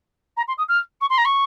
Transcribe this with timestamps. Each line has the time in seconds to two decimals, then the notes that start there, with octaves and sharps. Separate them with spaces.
0.37 A#5
0.48 C6
0.58 D#6
0.68 F6
1.01 C#6
1.09 C6
1.17 A#5
1.25 C#6